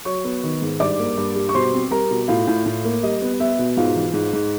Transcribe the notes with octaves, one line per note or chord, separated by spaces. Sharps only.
F#3 C#5 C#6
B3
D#3
G#2
G2 D5 D6
A#3
G2
G3
C#6
B2 C5 C6
C4
G3 A#4 A#5
B2
A2 F4 F5
A2
A2
A#3
G3 D#5
B3
B3 E5
B2
G#2 F4 F5
E3
G#2
G#2